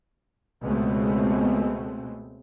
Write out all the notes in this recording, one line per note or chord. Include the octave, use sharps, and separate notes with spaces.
C#2 B2 G#3 A3 B3 C4